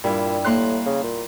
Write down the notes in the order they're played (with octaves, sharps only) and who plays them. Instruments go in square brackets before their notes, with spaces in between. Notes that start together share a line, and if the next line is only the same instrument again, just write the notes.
[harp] G2 E4 [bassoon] A#2
[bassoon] A2 [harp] A#3 C6 F#6
[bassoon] C#3
A#2